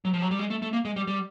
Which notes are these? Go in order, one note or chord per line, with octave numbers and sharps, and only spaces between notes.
F#3
F3
F#3
G3
G#3
A3
A3
A#3
G#3
G3
G3